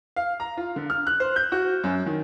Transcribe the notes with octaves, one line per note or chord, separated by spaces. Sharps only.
F5
A#5
F4
D3
F6
F#6
C5
G6
F#4
F#2
D#3